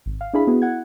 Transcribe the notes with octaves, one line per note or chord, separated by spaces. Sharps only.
G#1
F5
D4 E4 G#4 F5 B5
B3 E4 F#4 G#4
E4 F#5 G#6